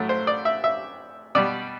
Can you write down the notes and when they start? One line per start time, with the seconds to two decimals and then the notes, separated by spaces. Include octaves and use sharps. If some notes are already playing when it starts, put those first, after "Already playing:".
Already playing: A2 F#3 A3
0.09 C5
0.27 D5
0.45 E5
0.64 E5
1.35 B2 G3 D5